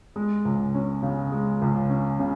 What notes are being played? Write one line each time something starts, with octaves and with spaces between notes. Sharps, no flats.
G#3
C#2
C#4
C#3
G#3
C#2
C#4
C#3